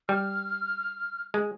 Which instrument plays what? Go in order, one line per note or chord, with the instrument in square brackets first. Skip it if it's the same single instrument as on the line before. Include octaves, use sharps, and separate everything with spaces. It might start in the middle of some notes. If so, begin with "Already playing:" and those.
[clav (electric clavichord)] G3 [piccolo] F6
[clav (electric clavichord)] G#3